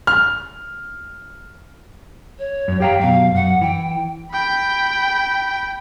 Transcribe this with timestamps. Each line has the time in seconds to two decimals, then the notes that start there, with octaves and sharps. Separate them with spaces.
0.07 F6
2.38 C#5
2.68 F#2
2.80 G4 F5 G5 A#5
3.00 F#2 B2 F5
3.35 F#2 F#5
3.61 E3 G5
4.32 G5 B5